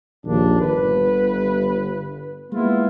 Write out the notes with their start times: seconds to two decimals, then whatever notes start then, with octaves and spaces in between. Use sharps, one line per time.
0.25 A#1 D#2 A#2 D4
0.61 G1 B4
2.53 G#3 A#3 B3 E4 F4